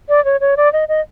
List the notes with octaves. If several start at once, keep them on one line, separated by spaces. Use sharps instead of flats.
D5
C#5
C#5
D5
D#5
D#5